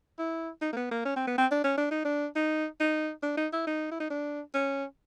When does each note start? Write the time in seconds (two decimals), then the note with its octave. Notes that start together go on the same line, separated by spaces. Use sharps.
0.19 E4
0.62 D#4
0.73 A#3
0.77 B3
0.91 A#3
1.05 C#4
1.16 C4
1.27 B3
1.38 C4
1.51 D4
1.64 C#4
1.78 D4
1.91 D#4
2.05 D4
2.35 D#4
2.80 D#4
3.23 D4
3.37 D#4
3.53 E4
3.67 D#4
3.91 E4
4.00 D#4
4.10 D4
4.54 C#4